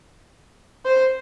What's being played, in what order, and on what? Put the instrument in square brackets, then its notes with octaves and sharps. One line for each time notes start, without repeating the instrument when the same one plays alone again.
[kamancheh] C5